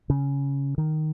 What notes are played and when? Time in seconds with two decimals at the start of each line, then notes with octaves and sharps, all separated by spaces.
0.10 C#3
0.78 D#3